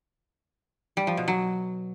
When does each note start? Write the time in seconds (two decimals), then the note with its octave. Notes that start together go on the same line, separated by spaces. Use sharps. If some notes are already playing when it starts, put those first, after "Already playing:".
0.97 G3
1.07 F3
1.17 B2
1.28 F#3